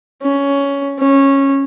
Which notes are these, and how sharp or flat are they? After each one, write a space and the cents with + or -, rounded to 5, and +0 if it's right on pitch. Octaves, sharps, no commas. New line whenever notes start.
C#4 +10
C#4 -15